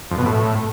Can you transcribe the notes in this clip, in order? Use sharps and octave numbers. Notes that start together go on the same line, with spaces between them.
F2
B2
A2